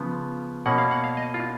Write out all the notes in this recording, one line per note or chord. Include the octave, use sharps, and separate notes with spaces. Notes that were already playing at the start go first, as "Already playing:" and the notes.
Already playing: C#3 F3 B3
B2 A#3 C#4 F#5
F5
F#5
F5
D#5
F4